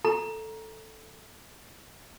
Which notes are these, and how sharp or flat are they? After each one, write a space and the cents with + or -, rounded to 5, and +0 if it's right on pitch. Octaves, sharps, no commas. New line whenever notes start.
A4 +0 A#5 +10